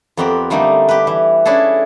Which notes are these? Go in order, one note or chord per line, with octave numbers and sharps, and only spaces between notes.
F2 B3 C4 G4 A#4
D3 G3 A3 A#3 D#4
G4 B4
E3
A3 C#4 D4 E4 G#4 A4